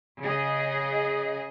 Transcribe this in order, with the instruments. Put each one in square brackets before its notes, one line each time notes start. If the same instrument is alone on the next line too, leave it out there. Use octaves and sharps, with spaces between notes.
[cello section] C#3 G#4 D#5